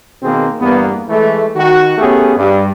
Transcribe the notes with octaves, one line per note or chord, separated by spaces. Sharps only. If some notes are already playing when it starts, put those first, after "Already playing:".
B2 D#3 A#3 C4 G#4
E2 G2 A#3 B3
E3 G#3 A3
D#3 F#4
A3 B3 C#4 G4 G#4
G2